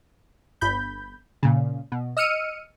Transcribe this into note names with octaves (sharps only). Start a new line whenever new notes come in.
G1 B5 G6
A#2 C#3
B2
D#5 E6 F6 C#7 D#7